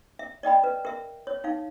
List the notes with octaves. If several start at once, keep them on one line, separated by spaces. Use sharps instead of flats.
E5
D5 D#5 G5 B5
B4
A#4 E5
C#5
D#4 F5